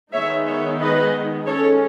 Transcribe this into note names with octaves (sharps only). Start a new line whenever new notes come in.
D#3 G#3 B3 D#4 C#5 E5
C#5 E5
B4 D#5
G#3 C#4 A4 C#5